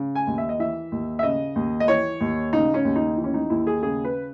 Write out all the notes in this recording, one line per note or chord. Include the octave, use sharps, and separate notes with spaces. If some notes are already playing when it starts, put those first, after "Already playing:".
Already playing: C#3
G#5
D#2
E5
D#5
E3 E5
D#2
E5
C#3 D#5
D#2
D#5
E3 C#5
D#2
C#3 D#4
C#4
D#2
D#4
E3
C#4
D#4
D#2 E4
G#4
C#3 G#4
B4